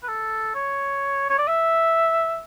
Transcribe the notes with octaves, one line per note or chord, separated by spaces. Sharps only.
B4
A4
C#5
C#5
D5
E5